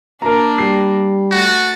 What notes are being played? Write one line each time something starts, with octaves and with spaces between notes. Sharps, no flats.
A#3 D4 A#4 A#5
G3 C7
A3 F#4 A6